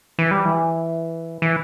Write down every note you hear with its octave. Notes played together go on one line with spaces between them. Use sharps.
E3
G3
E3
E3